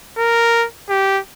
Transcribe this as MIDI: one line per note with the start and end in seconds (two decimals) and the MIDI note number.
0.18 0.66 70
0.89 1.19 67